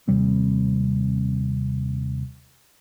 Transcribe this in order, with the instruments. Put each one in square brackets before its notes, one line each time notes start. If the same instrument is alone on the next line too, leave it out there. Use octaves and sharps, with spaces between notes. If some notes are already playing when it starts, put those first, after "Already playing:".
[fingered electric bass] D#2 C3 G3 C4